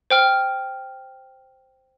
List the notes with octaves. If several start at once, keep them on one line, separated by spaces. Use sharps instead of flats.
C5 G5 F6